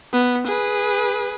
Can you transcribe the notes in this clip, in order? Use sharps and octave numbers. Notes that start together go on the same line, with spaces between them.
B3
G#4 B4